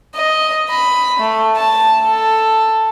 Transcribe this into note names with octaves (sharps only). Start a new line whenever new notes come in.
D#5
B5
A3
A5
A4